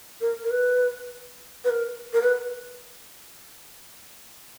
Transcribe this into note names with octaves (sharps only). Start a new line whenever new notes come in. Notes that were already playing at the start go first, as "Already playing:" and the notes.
A#4
A#4
B4
B4
A#4
A#4
B4